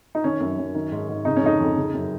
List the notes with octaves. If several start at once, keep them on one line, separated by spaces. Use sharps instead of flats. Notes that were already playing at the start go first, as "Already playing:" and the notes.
D#4
D#3 C#4
F#2
F#2
D#3
G#2
G#2
C#3 D#4
C#4
F2 D#4
F2
C#3
F#2